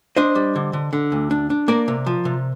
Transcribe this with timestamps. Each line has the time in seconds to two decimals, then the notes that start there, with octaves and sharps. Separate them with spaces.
0.17 D4 C5 D#5
0.35 G3
0.56 D3
0.73 D3
0.93 D3
1.12 D2
1.31 D4
1.50 D4
1.68 A#3 A#4 D5
1.88 C3
2.06 F3
2.25 C3